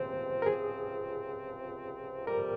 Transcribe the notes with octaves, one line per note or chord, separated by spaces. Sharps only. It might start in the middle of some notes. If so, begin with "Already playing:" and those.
Already playing: C#2 C3 F3 C4 C5
A#4
G#4
F2 C3 G3 A#4